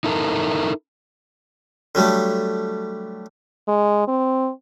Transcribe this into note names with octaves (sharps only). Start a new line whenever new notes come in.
D#4 E4 A4 A#4
D3 F#3 G3 A3
G#3
C4